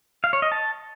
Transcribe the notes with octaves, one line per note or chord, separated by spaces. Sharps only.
F5
C#5
D#5
A5